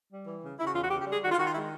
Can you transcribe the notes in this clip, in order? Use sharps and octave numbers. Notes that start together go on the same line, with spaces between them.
G3
E3
C#3
C#3 E4
F#4
E2 F4
F#4
C#3 G4
G4
G3 G#4
D#3 F#4
F4
D#3 F#4
F4
G#3 E4